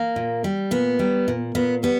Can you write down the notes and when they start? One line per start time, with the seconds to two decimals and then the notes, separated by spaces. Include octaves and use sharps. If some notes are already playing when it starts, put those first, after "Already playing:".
Already playing: A#3
0.16 A#2
0.44 G3
0.71 A#2 B3
0.99 G3
1.28 A#2
1.55 A#2 B3
1.83 G3 B3